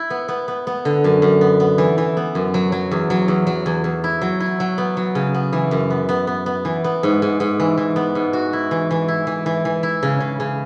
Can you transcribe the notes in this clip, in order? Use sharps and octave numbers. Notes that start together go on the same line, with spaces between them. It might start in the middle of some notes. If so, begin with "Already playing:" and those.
Already playing: E4
B3
B3
B3
B3
D3
F#2
F#2
B3
B3
E3
E3
B3
F#2
F#3
F#3
E2
F#3
E2
F#3
E2
E2
E4
F#3
E4
F#3
B3
F#3
C#3
B3
E3
F#2
B3
B3
B3
B3
E3
B3
G#2
G#2
G#2
E3
E3
B3
G#2
F#4
E4
E3
E3
E4
E3
E3
E3
E4
C#3
C#3
C#3